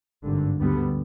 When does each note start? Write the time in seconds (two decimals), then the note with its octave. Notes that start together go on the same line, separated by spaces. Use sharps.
0.24 G#1 G2 D3
0.61 D2 D3 G3 B3